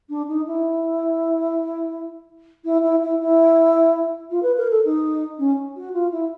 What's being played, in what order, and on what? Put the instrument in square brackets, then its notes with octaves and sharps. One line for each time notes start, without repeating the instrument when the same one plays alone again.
[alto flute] D4
D#4
E4
E4
E4
E4
E4
F4
B4
A#4
A4
D#4
C#4
F#4
F4
E4